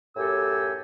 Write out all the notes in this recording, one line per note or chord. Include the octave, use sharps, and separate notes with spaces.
F#2 A2 G4 A4 G#5 E6